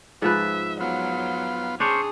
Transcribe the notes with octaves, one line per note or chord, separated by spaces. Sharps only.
G#2 F3 B4 E5
F#3 B3 F4
C#4 D4 G#4 C5 C#5